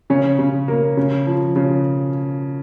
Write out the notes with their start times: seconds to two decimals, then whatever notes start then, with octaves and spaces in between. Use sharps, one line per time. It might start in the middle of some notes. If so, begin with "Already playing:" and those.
0.10 C#3 C#4
0.39 C#3
0.68 A#3
0.97 C#3
1.27 F3
1.56 C#3